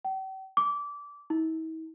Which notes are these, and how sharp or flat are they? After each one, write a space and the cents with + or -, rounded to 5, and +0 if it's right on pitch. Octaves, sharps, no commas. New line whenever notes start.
G5 -45
D6 -20
E4 -45